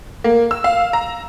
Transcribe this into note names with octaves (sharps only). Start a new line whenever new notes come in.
A#3
E6
F5
A#5